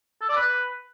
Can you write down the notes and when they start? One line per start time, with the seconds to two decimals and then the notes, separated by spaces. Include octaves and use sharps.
0.22 A4
0.29 D5
0.36 B4